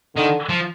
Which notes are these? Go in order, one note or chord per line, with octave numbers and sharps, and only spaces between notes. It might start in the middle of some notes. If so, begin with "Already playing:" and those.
D3 D#3
F3